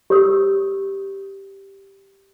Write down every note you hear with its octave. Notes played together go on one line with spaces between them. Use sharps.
G4 C#5 D#6 E6